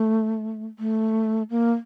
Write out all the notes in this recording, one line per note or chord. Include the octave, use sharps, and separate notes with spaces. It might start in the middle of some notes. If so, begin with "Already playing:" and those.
Already playing: A3
A3
A#3